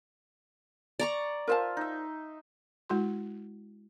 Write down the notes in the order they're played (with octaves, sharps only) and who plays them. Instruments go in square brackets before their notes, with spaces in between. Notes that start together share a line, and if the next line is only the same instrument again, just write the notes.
[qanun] D5 A#5 C#6
[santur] F4 E5 [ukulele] A#4 C5 A5
[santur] D#4 E5
[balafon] G#3 E4 F#4 C6